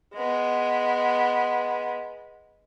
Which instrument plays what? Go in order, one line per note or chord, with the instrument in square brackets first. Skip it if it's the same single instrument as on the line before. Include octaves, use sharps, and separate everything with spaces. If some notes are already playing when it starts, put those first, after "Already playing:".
[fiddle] G#3 B3